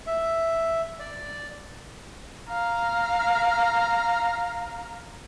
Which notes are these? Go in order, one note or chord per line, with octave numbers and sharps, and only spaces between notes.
E5
D5
F5 A#5